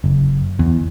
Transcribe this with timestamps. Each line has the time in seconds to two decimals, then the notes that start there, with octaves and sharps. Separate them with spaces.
0.04 F#1
0.59 E2